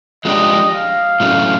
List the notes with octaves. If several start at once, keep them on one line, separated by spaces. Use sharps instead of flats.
F3 G#3 B3 D4 G4 D#5
F5
A2 F#3 A3 C#4